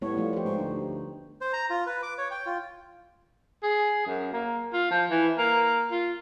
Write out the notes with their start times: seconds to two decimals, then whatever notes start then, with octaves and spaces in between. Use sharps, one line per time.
0.02 A2 G3 B3 C#5
0.17 F3 A3 F4
0.33 G4 C5
0.45 G#2
0.58 D2 D#4
1.41 C5
1.53 A#5
1.70 F4
1.87 B4
2.03 D6
2.18 C#5
2.31 G5
2.46 F4
3.63 G#4
4.07 F#2
4.33 A#3
4.73 F4
4.91 F3
5.10 E3
5.38 A#3
5.91 F4